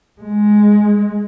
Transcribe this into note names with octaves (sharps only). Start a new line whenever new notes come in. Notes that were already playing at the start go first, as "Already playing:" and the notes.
G#3